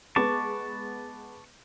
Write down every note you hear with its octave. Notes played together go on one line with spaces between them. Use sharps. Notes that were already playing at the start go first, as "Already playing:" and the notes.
G#3 B3 A5 C#6 D6